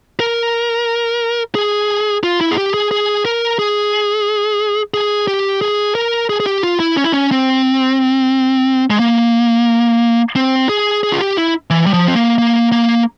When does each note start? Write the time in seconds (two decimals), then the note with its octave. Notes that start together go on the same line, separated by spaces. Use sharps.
0.20 A#4
1.55 G#4
2.23 F4
2.41 E4
2.51 G#4
2.58 G4
2.74 G#4
2.91 G#4
3.25 A#4
3.59 G#4
4.94 G#4
5.28 G4
5.62 G#4
5.95 A#4
6.30 G#4
6.40 G#4
6.46 G4
6.63 F4
6.80 E4
6.97 C#4
7.04 E4
7.12 C#4
7.31 C4
8.90 G#3
8.99 A#3
10.36 C4
10.69 G#4
11.03 G#4
11.12 F4
11.21 G4
11.37 E4
11.70 E3
11.86 G3
11.93 F3
12.08 C4
12.16 A#3
12.38 A#3
12.72 A#3